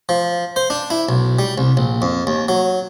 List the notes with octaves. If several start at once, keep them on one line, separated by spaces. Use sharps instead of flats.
F3
C5
D4
E4
B1
G3
C2
A#1
F2
D#2
F#3